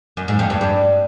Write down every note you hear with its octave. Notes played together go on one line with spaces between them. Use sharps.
F#2
G#2
F2
G2
G2